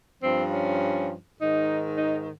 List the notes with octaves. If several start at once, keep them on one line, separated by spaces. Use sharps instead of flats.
G2 F3 C4
C#4
G#2 D#3 D#4
D#4